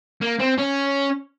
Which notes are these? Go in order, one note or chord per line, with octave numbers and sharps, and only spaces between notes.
A#3
C4
C#4